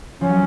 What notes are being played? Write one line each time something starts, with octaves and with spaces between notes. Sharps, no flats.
F3 C#4
F#3